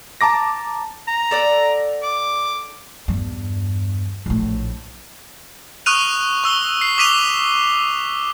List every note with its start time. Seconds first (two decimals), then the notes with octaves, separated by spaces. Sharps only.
0.21 A5 A#5 D6 A#6
1.08 A#5
1.31 A4 D5 F#5
2.03 D6
3.08 E2 G2
4.26 A#1 A2
5.86 C#6 D#6 F6 F#6 D#7 F7
6.44 C#6 E6 G7
6.81 C7
6.98 D6 D#6 B6 D#7 F7 G7